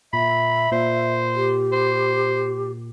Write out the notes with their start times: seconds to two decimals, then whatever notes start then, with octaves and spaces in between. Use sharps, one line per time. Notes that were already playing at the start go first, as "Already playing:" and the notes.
0.13 A#2 E5 B5
0.72 A#2 C5
1.36 G4
1.72 C5